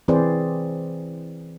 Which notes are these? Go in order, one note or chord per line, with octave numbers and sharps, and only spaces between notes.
E3 C4 G#4 B4 C5 D5